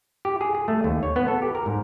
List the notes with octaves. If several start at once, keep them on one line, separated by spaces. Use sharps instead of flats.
G4
G#4
G#4
A3
D#2
C#5
B3
A4
G4
A#4
G#2